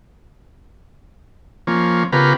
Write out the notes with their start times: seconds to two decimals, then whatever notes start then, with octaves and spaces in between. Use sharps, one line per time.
1.67 F3 A#3 C#4
2.12 C#3 B3 F4 G4 A#4 B4